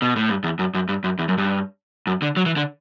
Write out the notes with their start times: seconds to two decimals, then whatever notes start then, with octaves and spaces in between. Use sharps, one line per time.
0.02 B2
0.16 A2
0.29 G2
0.44 E2
0.59 F#2
0.74 F#2
0.89 G2
1.04 F#2
1.19 E2
1.28 F#2
1.38 G2
2.07 F#2
2.22 D3
2.36 F#3
2.46 E3
2.56 D3